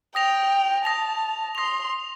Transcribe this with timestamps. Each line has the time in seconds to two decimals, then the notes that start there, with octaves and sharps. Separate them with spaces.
0.15 G5 D#6 A#6 F7
0.85 A5 D#6 A#6 F7
1.55 C6 D#6 A#6 F7